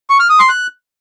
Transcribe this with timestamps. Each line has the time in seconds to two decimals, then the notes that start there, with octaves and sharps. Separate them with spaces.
0.10 C#6
0.20 F6
0.29 D#6
0.39 C6
0.49 F#6